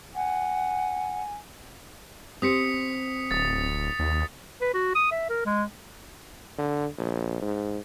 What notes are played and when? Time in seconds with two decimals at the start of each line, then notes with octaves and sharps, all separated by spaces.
0.15 F#5 G#5
2.42 C4 G4 C5 D#6 B6 C#7
3.31 D1 D#6 A6
3.99 D#2
4.61 B4
4.74 F#4
4.95 D#6
5.12 E5
5.29 A#4
5.46 G#3
6.58 D3
6.98 A#1
7.42 G#2